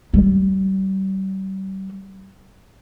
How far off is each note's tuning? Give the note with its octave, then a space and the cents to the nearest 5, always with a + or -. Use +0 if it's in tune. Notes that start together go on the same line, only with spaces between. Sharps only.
G3 -40